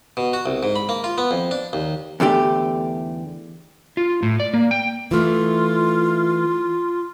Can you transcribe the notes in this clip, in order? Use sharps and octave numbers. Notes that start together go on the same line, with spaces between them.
B2
F#4
C2
G#2
B5
A#3
F4
B3
F2
D4
D#2
E2 D3 A3 G4
F4
A2
D5
A#3
G5
E3 A3 F4